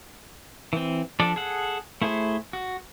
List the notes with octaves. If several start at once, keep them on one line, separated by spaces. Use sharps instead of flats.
E3 C4
F3 D4 A4 D5
G#4 A4 F#5
A3 E4 G#4 C5
F#4